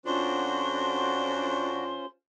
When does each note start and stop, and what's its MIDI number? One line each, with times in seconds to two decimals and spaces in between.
0.06 1.92 41
0.06 2.05 61
0.06 1.92 62
0.06 2.05 65
0.06 1.84 66
0.06 2.05 72
0.06 2.07 84